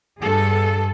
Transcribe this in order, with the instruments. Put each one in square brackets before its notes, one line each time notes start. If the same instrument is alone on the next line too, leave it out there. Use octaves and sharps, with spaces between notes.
[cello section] G2 G#4 A4